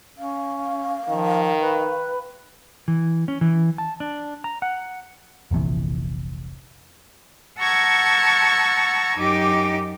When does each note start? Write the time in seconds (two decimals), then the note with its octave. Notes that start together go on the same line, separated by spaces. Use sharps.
0.18 C#4 F5
1.08 D#3 F3
1.61 B4
2.88 E3
3.28 C#4
3.41 E3
3.78 A5
4.00 D4
4.44 A#5
4.62 F#5
5.51 F1 A#1 C3 E3
7.59 F#5 A5 A#5 C#6 E6 G#6
9.17 F#2 D#4 G4 D6